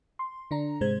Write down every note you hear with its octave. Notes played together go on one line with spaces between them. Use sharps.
C6
D3 D4 A#5
G#2 C3 G#3 C5 G#6